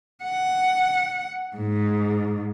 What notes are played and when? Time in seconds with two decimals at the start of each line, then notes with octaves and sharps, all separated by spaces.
0.24 F#5
1.56 G#2